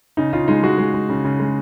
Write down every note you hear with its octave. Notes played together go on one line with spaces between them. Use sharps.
C#3 D#4
C#3 F4
G#3 D#4
G#3 F#4
G#3
G#3
C#3
C#3
G#3